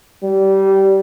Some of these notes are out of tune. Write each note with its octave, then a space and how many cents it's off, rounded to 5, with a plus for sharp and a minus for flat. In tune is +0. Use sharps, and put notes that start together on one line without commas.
G3 -20